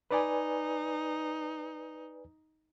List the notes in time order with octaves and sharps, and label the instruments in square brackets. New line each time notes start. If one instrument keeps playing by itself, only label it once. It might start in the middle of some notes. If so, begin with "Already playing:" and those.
[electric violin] D#4 [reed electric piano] B4 D5 G#5